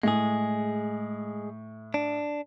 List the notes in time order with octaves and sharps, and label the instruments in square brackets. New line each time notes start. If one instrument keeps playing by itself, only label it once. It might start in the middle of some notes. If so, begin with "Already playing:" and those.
[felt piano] A2 [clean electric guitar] G#3 G#4
[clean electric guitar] D4